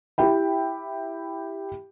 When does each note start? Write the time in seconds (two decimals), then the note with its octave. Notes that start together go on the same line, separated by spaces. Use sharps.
0.18 E4 G4 E5 G5 B5